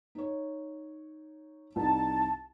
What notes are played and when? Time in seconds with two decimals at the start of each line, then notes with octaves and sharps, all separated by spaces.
0.15 D#4 C#5
1.76 C2 D#4 A5